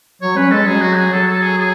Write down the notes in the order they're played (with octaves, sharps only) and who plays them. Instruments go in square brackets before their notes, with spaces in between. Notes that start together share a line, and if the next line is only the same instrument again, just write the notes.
[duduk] F#3 [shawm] C#5
[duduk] C#4 [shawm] B4
[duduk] G#3 [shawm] A4
[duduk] F#3 [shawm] G#4
[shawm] F#4
G#4
[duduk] F#3 [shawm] A4
[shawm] A4
G#4
G#4